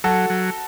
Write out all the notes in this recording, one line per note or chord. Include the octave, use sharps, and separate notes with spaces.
F#3 F#4 A4
F#3